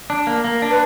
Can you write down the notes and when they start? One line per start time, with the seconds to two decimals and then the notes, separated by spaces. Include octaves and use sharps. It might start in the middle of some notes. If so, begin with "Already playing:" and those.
0.10 D4
0.27 A#3
0.44 A#3
0.62 D4
0.69 B4